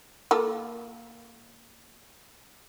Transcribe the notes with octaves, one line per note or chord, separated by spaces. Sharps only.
A#3 F4 A4